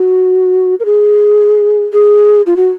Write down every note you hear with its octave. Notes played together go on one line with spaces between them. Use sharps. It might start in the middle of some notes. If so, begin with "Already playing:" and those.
Already playing: F#4
A#4
G#4
G#4
F4
F#4